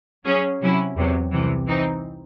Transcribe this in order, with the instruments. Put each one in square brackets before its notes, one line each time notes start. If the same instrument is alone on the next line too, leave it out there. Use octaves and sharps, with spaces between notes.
[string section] F#3 C#4 G#4 C#5
C3 F#3 C#4 E4
E2 C3 F#3
C2 C3 E3
E3 C4 D#4